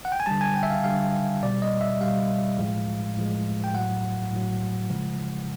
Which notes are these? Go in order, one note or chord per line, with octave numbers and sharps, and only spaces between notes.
F#5
G5
G#5
D3 G3 A5
G#5
G5
E5
F5
D3 G3 F5
B2 G3 D5
D#5
E5
B2 G3 F5
A2 F3 G#3
A2 F3 G#3
G5
A2 F#3 F#5
A2 F#3
C#3 F3 G#3